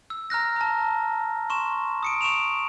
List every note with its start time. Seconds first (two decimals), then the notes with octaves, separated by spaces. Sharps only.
0.10 E6
0.30 A#5 F6 F#6 A#6
0.56 A5 A#5
1.50 C6 C#6 E7
2.03 D#6 C#7 D7
2.21 C#6 D7 E7 F7